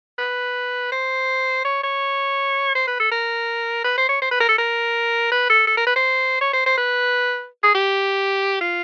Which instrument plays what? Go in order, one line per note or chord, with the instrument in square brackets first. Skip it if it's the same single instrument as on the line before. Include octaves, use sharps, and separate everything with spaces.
[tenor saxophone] B4
C5
C#5
C#5
C5
B4
A4
A#4
B4
C5
C#5
C5
B4
A#4
A4
A#4
B4
A4
A4
A#4
B4
C5
C#5
C5
C5
B4
G#4
G4
F4